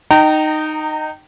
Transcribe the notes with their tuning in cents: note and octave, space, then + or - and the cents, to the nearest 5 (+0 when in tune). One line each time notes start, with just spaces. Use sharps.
D#4 -10 G5 -25 A#5 -30